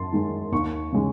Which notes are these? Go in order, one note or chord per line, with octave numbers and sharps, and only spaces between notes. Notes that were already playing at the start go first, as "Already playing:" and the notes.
Already playing: F#2 A5 C6
D#3 G#3
D#2 C#6
C#3 G#3